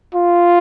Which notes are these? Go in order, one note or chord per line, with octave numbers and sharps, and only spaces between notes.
F4